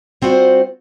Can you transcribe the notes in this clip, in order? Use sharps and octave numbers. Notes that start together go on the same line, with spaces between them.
G3 C4 F4 F#4 C5 F#5